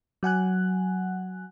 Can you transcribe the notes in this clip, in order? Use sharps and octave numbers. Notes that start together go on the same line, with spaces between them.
F#3 F#5 G#5 F#6